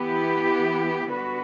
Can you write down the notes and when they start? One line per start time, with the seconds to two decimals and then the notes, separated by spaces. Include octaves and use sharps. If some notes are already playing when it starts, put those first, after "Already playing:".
Already playing: E3 B3 E4 G4
1.10 D3 G3 B3 F#4 B4